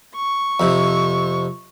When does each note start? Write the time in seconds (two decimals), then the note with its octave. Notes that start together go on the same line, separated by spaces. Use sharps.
0.16 C#6
0.60 F2 C3